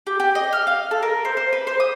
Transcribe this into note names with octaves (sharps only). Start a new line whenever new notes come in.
G4
G4
D#5
F6
F5
A4
A#4
C5
C5
B4
C5
D#6